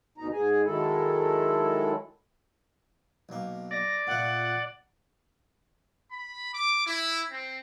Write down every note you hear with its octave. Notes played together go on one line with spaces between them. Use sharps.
D2 B2 D#4 A#5
G#2 G#4 G#5
D#3 F#3 G#3 E4 A4
B1 A#3
D5 A#6
A#2 A3 F#5
B5
D6
E4
C4